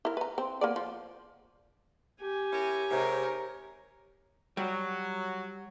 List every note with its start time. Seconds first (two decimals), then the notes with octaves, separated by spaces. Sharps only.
0.05 E4 A#4
0.17 B4 A#5
0.38 C4
0.61 A#3 B3 D5
0.76 F3
2.21 G4 G#5
2.52 C#4 E4 A#4
2.90 G#2 C3 A#4 C#5
4.57 F#3 G3